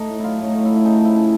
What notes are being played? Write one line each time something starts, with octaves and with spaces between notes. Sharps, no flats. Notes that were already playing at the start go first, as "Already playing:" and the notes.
Already playing: A3 D#4
A2
F#3 E4 F4
A2
D#4
A3
E4
A3
E4
C#3 D#4
F3 E4
C#3